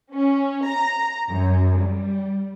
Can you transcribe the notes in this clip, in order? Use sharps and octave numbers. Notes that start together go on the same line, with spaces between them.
C#4
A#5
F#2
G3